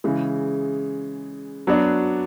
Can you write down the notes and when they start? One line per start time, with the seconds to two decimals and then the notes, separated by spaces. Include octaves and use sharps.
0.04 C#3 E3 G#3
1.67 F#3 B3 D4 F#4